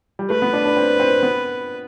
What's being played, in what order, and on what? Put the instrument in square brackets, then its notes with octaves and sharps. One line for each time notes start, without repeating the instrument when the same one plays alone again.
[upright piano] G3
[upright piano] A3 [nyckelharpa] B4
[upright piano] B3
D4
D4
C4
C4
B3